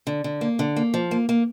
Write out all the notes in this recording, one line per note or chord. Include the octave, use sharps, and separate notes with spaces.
D3
D3
A#3
D3
A#3
F3
A#3
A#3